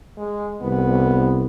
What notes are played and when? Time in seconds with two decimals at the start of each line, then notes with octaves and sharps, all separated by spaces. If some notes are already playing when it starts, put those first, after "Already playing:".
0.17 G#3
0.62 C2 B3